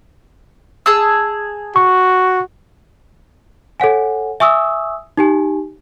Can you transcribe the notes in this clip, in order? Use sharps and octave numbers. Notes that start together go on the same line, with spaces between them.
G#4 A5 E6
F#4 C#6
A4 C#5 F#5 G#5
E5 G#5 C#6 D#6 E6
D#4 G4 G#5